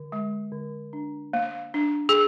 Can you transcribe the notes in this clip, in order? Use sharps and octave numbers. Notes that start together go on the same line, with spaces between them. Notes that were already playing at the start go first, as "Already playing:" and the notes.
Already playing: D3
G#3
D3
D4
A#3
D4
G#4